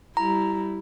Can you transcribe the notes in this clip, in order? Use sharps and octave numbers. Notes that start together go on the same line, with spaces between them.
G3 E4 A#5